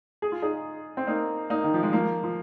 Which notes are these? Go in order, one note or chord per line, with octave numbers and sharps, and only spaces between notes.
G#4
F4
D#4 G#4
C4
A#3 D#4
A#3 D#4
D#3
F3
G#3
F3 A#3
F3